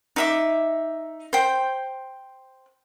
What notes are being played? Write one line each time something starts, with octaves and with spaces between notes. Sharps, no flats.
D#4 E5 D6
C5 G5